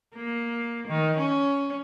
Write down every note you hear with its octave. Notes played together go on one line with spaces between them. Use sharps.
A#3
D#3
C#4